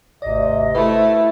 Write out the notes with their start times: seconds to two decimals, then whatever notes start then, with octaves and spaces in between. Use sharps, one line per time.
0.22 G#1 D2 C3 D5 D#5
0.75 A3 E4 B4 C5